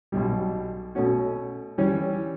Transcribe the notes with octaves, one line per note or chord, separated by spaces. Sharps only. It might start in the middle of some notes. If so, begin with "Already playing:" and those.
B1 B2 G3
B2 A3 C#4 F#4
E3 G3 C#4